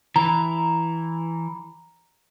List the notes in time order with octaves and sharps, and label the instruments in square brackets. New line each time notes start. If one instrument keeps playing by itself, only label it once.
[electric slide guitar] E3 [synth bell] A#5